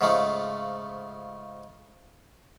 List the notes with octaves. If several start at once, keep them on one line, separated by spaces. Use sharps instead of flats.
G#2 C#3 F3 A3